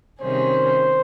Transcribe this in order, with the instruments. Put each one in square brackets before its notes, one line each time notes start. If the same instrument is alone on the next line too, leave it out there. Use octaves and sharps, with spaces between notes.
[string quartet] C3 D#3 G3 C#4 G#4 [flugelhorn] C5